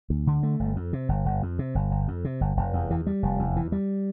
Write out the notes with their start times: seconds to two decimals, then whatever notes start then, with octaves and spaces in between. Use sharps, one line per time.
0.10 D2
0.27 D3
0.43 A3
0.60 G1
0.76 F2
0.93 C3
1.09 G1
1.26 G1
1.42 F2
1.59 C3
1.75 G1
1.91 G1
2.08 F2
2.25 C3
2.41 G1
2.57 F1
2.73 E2
2.91 E3
3.07 G3
3.23 F1
3.39 E2
3.56 E3
3.72 G3